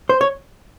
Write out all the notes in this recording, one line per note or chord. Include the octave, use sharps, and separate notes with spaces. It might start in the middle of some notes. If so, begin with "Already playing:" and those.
C5
C#5